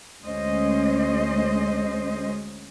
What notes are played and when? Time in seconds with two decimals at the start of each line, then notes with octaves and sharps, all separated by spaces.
0.23 D2 G#3 C#4 C5 D#5